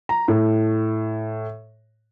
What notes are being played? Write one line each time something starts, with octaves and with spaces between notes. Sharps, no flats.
A#5
A2